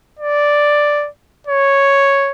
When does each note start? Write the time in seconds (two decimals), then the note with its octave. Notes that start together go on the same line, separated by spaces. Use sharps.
0.19 D5
1.47 C#5